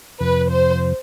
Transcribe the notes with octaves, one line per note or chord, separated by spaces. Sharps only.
F2 C3 F3 B4
C5